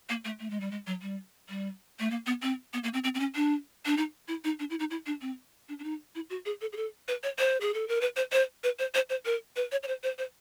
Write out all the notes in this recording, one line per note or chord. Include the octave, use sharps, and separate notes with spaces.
A#3
A3
A3
G#3
G3
G#3
F#3
G3
G3
A3
A#3
B3
C4
B3
A#3
C4
C4
C4
C#4
D4
D4
D#4
E4
D#4
D4
E4
D#4
E4
D4
C4
D4
D4
D#4
E4
F#4
G#4
A4
G#4
A4
B4
C#5
C5
G#4
A4
A#4
B4
C5
C5
B4
C5
C5
C5
A#4
B4
C#5
C#5
C5
C5
C5